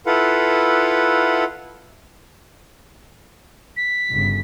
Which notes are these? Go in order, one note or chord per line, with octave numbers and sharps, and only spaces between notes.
E4 F4 A4 B4 F5 F#5
B6
G1 C#3